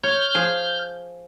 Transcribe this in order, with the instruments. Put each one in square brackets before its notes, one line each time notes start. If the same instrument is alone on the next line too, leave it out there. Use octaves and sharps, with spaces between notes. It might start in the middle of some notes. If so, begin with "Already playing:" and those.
[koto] C#5 [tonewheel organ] F6 G6
[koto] F3 G#4